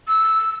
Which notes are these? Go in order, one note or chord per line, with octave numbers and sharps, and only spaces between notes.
E6